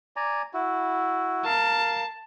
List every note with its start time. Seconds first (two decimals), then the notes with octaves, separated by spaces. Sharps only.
0.16 D5 G#5 A#5
0.54 E4 F#4
1.45 A#4 F5 A5